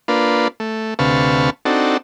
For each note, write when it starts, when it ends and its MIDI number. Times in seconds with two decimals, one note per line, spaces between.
0.08 0.48 58
0.08 0.48 62
0.08 0.48 65
0.08 0.48 71
0.60 0.94 57
0.99 1.50 38
0.99 1.50 48
0.99 1.50 71
0.99 1.50 77
0.99 1.50 81
0.99 1.50 85
1.65 1.97 60
1.65 1.97 62
1.65 1.97 63
1.65 1.97 66
1.65 1.97 69